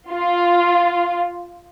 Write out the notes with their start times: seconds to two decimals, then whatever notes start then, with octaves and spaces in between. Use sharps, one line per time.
0.11 F4